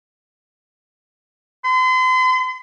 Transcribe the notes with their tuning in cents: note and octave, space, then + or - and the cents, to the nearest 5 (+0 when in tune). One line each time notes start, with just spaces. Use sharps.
C6 -40